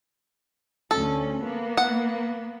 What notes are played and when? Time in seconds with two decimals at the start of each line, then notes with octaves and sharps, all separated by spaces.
0.91 D2 C#4 A4
1.43 A#3 B3
1.77 F#5